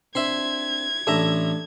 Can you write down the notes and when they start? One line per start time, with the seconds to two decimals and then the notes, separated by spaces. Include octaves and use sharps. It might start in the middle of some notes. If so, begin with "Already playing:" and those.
0.15 C4 D4 E5 B5 C6 G#6
1.07 A1 D4 A4 E5 A#5